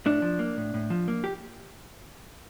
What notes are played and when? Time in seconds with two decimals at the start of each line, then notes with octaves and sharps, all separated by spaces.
0.06 A2 D4
0.22 F3
0.39 A#3
0.57 A2
0.74 A2
0.90 F3
1.08 A#3
1.24 G4